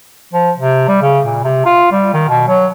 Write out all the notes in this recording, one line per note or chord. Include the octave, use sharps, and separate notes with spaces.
F3
C3
G3
C#3
A#2
C3
F4
G3
D#3
B2
F#3